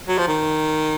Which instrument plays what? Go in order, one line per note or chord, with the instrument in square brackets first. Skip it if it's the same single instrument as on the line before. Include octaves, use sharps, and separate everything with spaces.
[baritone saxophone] F#3
F3
D#3